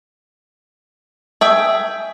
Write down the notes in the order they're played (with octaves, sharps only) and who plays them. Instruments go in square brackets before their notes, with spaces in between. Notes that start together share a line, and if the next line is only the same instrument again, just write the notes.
[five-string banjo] G#4 E5 G5